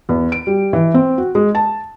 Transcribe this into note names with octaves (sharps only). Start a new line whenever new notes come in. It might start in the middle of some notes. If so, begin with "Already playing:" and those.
E2
D7
G3
E3
C4
F#4
G#3
A5